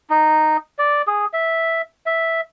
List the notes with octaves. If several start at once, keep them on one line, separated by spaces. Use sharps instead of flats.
D#4
D5
G#4
E5
E5